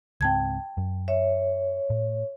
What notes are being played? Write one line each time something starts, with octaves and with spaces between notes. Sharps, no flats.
C#2 G#2 C4 G5 A5 G#6
F#2
C#5 E5
A2